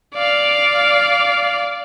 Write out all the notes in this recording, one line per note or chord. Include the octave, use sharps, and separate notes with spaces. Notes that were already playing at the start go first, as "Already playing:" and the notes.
D5 F5